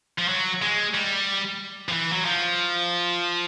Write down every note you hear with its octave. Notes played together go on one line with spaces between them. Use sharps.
F3
F#3
G#3
G3
F3
E3
F#3
F3